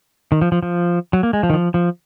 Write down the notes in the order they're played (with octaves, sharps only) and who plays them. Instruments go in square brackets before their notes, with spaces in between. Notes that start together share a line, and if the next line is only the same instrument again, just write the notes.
[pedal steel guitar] D#3
F3
F3
F3
F#3
A#3
G#3
F3
D#3
F3
F3